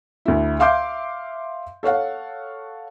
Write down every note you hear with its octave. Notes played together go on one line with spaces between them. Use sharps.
D2 E4
E5 F5 C6 D6 G6
A4 C#5 F5 F#5